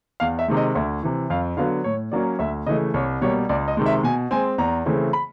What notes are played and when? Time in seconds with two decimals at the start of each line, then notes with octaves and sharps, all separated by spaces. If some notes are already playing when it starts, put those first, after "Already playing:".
0.20 E2 F5
0.39 E5
0.48 C3 D#3 G#3
0.57 D#5
0.75 D2 E5
1.03 C3 E3
1.30 F2 F5
1.57 D3 F#3 B3 F5
1.84 A2 C#5
2.12 F#3 A#3 C#4 D5
2.39 D2 E5
2.66 C#3 E3 A3 D#5
2.94 C2 C#5
3.21 B2 G3 A#3 C#5
3.49 C#2 D5
3.68 D#5
3.77 C3 D#3 G#3
3.86 E5
4.03 B2 G#5
4.31 G#3 C4 G#5
4.58 E2 A#5
4.86 C#3 E3 A3 C4
5.13 B5